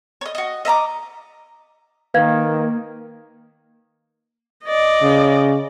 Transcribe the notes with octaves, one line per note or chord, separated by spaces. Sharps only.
C#5 D#5
F#4 D#5
D#5 E5 A#5 D6
D#3 A#3 B4 F5 G#6
D5 D#5
C#3